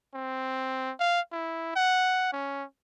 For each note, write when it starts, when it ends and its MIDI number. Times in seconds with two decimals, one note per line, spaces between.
0.14 0.92 60
1.00 1.21 77
1.31 1.71 64
1.75 2.28 78
2.32 2.64 61